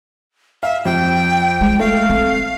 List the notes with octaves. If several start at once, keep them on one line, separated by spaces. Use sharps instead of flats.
E5 F5
F2 G5
G#3
A3 F5
C4